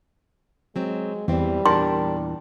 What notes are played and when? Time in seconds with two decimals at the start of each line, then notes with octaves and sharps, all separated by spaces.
0.76 F#3 G#3 C4
1.28 E2 E3 G3 C4
1.66 E2 A#2 D4 G4 A#4 A5 C6